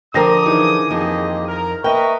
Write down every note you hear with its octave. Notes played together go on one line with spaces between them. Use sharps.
D3 F3 A#4 C5 G5 D6 D#6 A#6
D#3 E3 D#4 G#4
F2 A#3 G4 D#5
A#4
A#3 A#4 B4 D#5 E5 G5 C#6